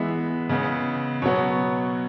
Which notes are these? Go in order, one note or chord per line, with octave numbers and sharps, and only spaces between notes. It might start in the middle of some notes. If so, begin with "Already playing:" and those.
Already playing: E3 G#3 B3 E5
C#3 G#3 B3
B2 F#3 B3 C#5